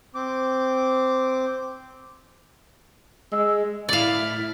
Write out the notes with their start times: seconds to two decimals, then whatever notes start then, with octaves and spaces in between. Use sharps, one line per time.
0.15 C4 D6
3.32 G#3 E6
3.89 A2 E4 D5 F5